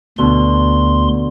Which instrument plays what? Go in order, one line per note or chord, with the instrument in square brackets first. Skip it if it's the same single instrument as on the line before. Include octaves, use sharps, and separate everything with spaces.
[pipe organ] D2 C6 [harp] B2 D3